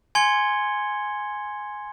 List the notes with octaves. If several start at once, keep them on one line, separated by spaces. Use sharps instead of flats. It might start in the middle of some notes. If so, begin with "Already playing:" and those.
G#5 C6 G#6 C#7 G7